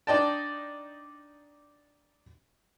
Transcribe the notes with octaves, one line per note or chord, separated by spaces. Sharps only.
D4 D#4 D5 D#5 G5 A5